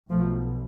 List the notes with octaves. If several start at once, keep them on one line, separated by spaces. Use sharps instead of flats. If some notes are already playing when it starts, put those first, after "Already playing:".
B1 B2 F3 A3